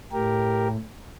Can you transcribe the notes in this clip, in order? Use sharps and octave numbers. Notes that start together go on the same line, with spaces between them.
A2 G4 A#4